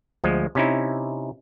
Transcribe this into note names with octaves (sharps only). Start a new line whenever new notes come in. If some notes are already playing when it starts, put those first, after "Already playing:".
D2 F3 G#3
C3 C#4 D#4 E4